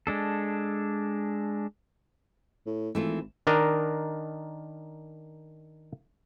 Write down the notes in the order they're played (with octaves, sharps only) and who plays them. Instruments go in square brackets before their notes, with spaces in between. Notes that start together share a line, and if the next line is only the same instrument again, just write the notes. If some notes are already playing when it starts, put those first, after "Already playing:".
[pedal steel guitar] G#3 D4 A4
[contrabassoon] A2
[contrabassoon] G#1 [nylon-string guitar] E3 A3 F4
[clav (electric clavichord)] D#3 D4 A#4 D#5